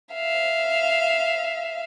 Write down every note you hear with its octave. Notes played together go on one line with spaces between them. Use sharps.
E5 F5